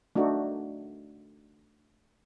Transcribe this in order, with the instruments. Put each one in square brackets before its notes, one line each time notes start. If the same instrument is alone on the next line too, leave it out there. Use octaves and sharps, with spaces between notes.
[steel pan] A3 D4 D#4 F#4